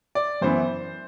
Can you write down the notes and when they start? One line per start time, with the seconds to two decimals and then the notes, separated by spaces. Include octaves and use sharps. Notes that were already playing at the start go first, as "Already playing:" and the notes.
0.15 D5
0.41 F#2 E3 B3 C5